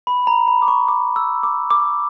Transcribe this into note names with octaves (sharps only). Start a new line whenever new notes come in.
B5
A#5
B5
D6
C#6
D6
E6
D6
D6